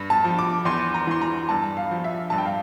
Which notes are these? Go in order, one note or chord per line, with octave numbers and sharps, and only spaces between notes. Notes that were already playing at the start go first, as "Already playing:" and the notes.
Already playing: G2
A5
F3
D6
E2 C6
A#5
E3 C6
A#5
G2 A5
F5
F3
E5
G2 A5
G5
F5